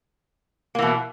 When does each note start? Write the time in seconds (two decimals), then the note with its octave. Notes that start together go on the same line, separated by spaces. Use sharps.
0.75 A#3
0.79 E3
0.82 B2